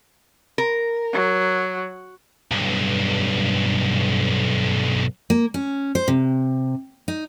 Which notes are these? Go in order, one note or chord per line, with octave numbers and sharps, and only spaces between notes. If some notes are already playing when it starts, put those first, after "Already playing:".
A#4
F#3
B1 G2
A#3
C#4
C5
C3
D#4